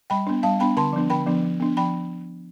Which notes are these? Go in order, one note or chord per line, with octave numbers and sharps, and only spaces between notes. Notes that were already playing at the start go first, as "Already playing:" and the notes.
G3 G5 B5
B3 D4
G3 F5 A5
B3 D4 G5 B5
D3 A5 C6
F3 B3 D4
D3 G5 B5
F3 B3 D4
F3
B3 D4
F3 G5 B5